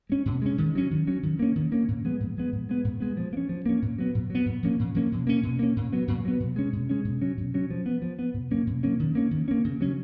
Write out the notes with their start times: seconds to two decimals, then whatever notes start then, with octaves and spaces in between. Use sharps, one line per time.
0.09 G#3 C#4
0.26 B2
0.42 G#3 C#4
0.58 D#3
0.75 F#3 C#4
0.91 D#3
1.07 F#3 C#4
1.23 D#3
1.39 A#3 C#4
1.56 D#3
1.72 A#3 C#4
1.88 A#2
2.04 F3 G#3 B3
2.20 A#2
2.37 F3 G#3 B3
2.52 A#2
2.69 G#3 B3
2.84 A#2
3.00 G#3 B3
3.17 F3
3.33 A#3
3.37 C#4
3.49 F3
3.66 A#3 C#4
3.82 A#2
3.98 F#3 B3
4.15 A#2
4.30 F#3 B3
4.46 A#2
4.63 F3 A#3 C#4
4.79 A#2
4.95 F3 A#3 C#4
5.12 B2
5.27 A#3 C#4
5.43 B2
5.59 A#3 C#4
5.76 A#2
5.92 F#3 B3
6.08 A#2
6.25 F#3 B3
6.40 B2
6.56 G#3 C#4
6.73 B2
6.90 G#3 C#4
7.05 B2
7.21 F#3 C#4
7.37 B2
7.54 F#3 C#4
7.70 F3
7.86 B3
8.02 F3
8.19 B3
8.34 B2
8.50 F#3 A#3 C#4
8.67 B2
8.83 F#3 A#3 C#4
9.00 D#3
9.15 A#3 C#4
9.31 D#3
9.48 A#3 C#4
9.64 C#3
9.81 F#3 C#4